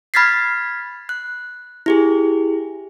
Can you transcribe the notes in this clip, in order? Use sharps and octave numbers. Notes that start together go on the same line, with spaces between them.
B5 F6 G#6 A6 B6 C7
F#6
E4 G4 G#4